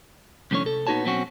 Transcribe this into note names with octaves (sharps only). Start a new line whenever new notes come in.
C2 F2 A2 D3 C#4 C#5
C3 A4
A#2 B3 D#4 F#4 C#5 A5
B2 F#3 C4 C#4 F#4